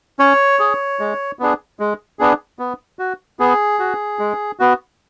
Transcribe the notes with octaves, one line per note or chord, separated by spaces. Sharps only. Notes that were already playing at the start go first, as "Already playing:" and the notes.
C#4 C#5
G#4
G#3
B3 D4 G#4
G#3
B3 D4 G#4
B3
F#4
B3 G#4
F#4
G#3
B3 F#4